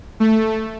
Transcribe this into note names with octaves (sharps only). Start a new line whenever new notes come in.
A3